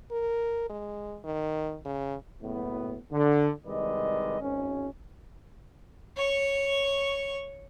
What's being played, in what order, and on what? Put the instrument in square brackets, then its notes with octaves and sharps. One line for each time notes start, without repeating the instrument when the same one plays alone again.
[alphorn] A#4
G#3
D#3
C#3
[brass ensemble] F#1 A2 B3
D3
C2 D#3 G#3 B4 D5 D#5
G#1 C#4
[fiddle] C#5 C#6